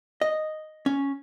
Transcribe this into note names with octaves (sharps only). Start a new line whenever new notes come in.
D#5
C#4